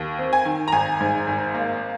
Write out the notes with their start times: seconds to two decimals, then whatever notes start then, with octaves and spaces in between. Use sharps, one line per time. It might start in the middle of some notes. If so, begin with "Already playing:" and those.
Already playing: D#2
0.19 C4
0.33 G#5
0.45 D#3
0.68 A#5
0.72 G#1 G#5
1.00 G#2
1.27 G#1
1.55 A#3